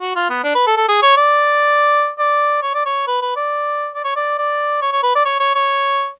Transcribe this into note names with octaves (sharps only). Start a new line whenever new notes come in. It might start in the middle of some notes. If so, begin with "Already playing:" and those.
F#4
F4
B3
D4
B4
A4
A4
G#4
C#5
D5
D5
C#5
D5
C#5
B4
B4
D5
D5
C#5
D5
D5
C#5
C#5
B4
D5
C#5
C#5
C#5